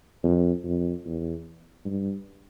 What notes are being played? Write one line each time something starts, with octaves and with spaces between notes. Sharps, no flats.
F2
F2
E2
G2